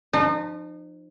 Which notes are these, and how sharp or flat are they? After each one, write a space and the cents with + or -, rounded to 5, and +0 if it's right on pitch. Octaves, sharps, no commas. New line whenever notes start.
F3 +0 D#4 -35